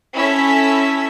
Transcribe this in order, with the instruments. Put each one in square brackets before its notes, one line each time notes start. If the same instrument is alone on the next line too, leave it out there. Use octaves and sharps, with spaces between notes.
[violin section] C#4 E4 A4 E6 B6